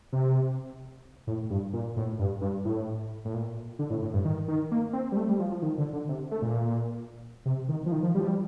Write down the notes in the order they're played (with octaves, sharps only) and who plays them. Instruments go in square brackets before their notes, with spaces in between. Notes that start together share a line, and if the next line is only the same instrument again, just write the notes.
[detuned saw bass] C3
A2
G2
A#2
A2
G2
G2
A2
A2
A#2
D3
A2
A2
G2
D#3
D#3
A#3
C4
G3
A3
G3
F3
F3
D#3
D3
D3
C3
A3
A#2
C3
D#3
F3
D#3
F3
G3
F3
G3